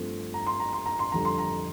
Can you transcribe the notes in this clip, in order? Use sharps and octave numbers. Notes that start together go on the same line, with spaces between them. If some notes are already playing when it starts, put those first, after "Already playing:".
Already playing: G2 F3 A3 C4
A#5
C6
A#5
C6
A#5
C6
F2 D3 G3 A#5
C6
A#5